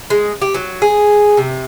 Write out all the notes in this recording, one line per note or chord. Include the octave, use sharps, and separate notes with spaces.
G#3
G4
F#3
G#4
C3